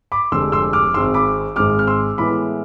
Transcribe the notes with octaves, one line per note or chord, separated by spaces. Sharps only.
B5 D6
F1 F2 D3 G#3 D4 C6 E6
C6 E6
D6 F6
G#1 G#2 G#3 C4 C6 E6
B5 D6
G#1 G#2 G#3 C4 D6 F6
F6
C6 E6
A2 E3 G#3 B3 B5 D6